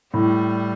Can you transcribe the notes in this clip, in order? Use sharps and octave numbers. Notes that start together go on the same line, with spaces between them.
A2 G3